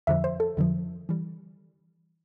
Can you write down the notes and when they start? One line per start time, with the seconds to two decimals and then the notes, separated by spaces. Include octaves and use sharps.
0.07 F2 D3 F3 E5
0.24 C5
0.40 A4
0.57 F2 D3 F3
1.09 E3 G3